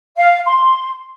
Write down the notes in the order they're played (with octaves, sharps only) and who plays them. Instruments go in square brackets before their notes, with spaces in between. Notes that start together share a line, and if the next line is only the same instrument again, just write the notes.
[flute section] F5
C6